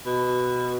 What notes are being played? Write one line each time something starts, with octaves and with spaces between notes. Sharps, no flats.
B2